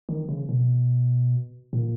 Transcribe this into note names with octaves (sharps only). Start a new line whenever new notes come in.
D#3
C#3
B2
A#2